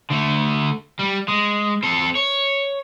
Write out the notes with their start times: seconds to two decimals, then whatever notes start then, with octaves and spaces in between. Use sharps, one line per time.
0.10 D3 A3
0.99 G3
1.28 G#3
1.83 C4 A4
2.15 C#5